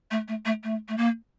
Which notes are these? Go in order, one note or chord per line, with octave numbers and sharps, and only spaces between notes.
A3
A3
A3
A3
A3
A#3